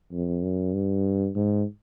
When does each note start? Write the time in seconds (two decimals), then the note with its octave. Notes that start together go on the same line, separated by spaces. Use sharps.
0.12 F2
0.43 F#2
0.74 G2
1.36 G#2